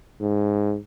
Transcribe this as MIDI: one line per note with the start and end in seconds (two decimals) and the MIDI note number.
0.21 0.77 44